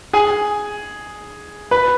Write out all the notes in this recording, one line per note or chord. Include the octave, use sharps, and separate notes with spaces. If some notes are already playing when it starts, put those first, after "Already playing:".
G#4 G#5
B4 B5